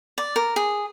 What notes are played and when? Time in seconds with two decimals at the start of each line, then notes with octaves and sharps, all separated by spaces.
0.18 D5
0.36 A#4
0.56 G#4